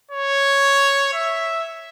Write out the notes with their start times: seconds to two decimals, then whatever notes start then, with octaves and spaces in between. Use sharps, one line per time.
0.11 C#5
1.14 E5